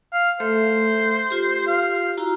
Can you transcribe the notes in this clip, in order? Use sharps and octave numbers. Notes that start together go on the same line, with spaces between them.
F5
A3 A4 C5 E5
F4 G4
F5
E4 F#4 A#5